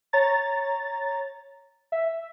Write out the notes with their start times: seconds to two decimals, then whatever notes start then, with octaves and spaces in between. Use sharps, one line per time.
0.13 C#5 A#5 A6
1.92 E5